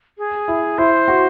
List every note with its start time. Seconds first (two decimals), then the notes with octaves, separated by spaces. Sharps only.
0.18 G#4
0.48 E4
0.78 E4 C5
1.08 F#4